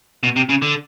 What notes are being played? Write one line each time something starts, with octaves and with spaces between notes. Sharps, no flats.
B2
C3
C#3
D3